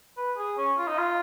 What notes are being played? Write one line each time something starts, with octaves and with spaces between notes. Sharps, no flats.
B4
G#4
C#4
F4
D#4
F4